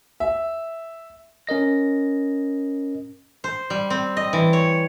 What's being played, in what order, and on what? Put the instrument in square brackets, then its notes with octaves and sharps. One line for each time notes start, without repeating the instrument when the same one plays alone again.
[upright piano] E5
[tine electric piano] C#4 A#4 D#5 A#6
[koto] C5
G3
C4
D#5
E3
C#5